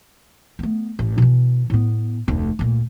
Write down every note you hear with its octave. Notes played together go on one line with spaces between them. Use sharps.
A3 B3
A1
B2 E3
A2 B3
F1 D2
D2 A#2